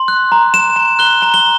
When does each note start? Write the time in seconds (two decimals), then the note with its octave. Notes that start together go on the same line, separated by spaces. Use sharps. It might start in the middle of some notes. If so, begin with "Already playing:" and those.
Already playing: C6
0.08 F#6
0.32 A#5
0.54 A#5 E7
0.76 A#5
0.99 F#6 G7
1.22 A#5
1.34 G7